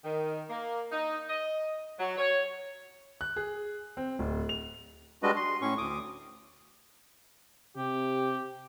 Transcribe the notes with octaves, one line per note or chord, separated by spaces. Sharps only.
D#3
A#3
D#4
D#5
F#3
C#5
F#6
G#4
C4
D1
F7
G3 G#3 D4 F#4 B4 D#5
C6
A2 C#4 C#6
D2 D6 D#6
C3 G4